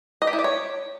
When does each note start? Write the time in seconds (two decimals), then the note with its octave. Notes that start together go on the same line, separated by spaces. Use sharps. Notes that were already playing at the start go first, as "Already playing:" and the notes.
0.22 D#5
0.27 G4
0.33 E4
0.39 D5
0.44 C#5